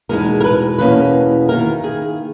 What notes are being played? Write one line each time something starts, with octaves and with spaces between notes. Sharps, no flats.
E2 B2 G#3 D#4 A#4
A#4
B4
E2 B2 A#3 C#4 B4
D#3 A#3 E4 A#4
G#4